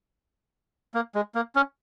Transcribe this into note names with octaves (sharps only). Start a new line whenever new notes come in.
A#3
G#3
A#3
C#4